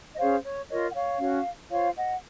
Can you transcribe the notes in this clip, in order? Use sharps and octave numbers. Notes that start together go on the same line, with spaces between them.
D#5
C#4 G#4 C5 C#5 F5
C#5
F4 A#4 C#5 D#5
F#5
C#5 F5
C#4 F#4 C#5
F4 C5 C#5 F5
D#5 F#5